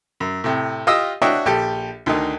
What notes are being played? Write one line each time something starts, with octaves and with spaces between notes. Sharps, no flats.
F#2
A2 C3
F4 G4 D#5 D#6 E6
D4 F#4 C#5 D#5 E5 G5
A#1 G4 A4
D2 D3 D#3 D#4